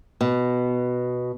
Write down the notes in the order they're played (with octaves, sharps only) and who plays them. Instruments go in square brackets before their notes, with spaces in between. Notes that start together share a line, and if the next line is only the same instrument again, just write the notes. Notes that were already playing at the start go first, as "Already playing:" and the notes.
[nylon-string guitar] B2